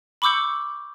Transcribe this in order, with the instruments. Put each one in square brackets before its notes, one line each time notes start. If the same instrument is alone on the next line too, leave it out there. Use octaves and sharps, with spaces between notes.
[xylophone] B5 C#6 D6 E6 G6 C#7